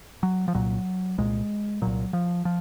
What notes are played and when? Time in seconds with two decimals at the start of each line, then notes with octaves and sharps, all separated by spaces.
0.23 F#3
0.48 F3
0.54 C2 A#2 F#3
1.18 C2 A#2 G#3
1.82 C2 A#2 F#3
2.13 F3
2.45 F3